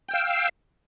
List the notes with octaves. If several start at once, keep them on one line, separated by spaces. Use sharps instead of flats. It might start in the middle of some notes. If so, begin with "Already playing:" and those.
F5 G5 E6